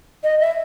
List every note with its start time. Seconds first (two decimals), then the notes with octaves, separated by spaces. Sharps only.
0.24 D#5
0.40 E5